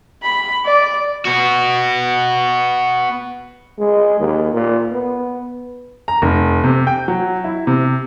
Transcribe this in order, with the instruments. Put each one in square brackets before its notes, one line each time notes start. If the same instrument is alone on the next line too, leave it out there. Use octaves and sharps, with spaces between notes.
[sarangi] B5
D5
[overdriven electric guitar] B3 F#4
[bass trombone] G#3
D#2
A#2
B3
[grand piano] A#5
F1
C3
G5
F#3
E4
C3